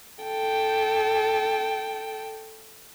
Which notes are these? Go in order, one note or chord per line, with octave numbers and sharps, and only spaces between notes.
A4 G5